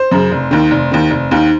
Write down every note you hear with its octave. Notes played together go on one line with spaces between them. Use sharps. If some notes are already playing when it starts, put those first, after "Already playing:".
Already playing: C5
F#2 C#3
F1
D#2 D#3
F1
D#2 D#3
F1
D#2 D#3